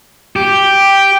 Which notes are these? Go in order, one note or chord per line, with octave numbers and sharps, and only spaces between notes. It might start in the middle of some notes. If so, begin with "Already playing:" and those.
G4